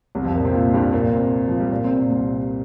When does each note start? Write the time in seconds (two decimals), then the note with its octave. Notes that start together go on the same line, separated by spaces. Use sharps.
0.15 C2 C3
0.25 F2 F3
0.35 A#2 A#3
0.44 C3 C4
0.54 A#2 A#3
0.74 G2 G3
0.93 A#2 A#3
1.13 C3 C4
1.48 F3
1.60 G3
1.71 A#2 A#3
1.84 C3 C4
1.97 A#2 A#3
2.10 C2 C3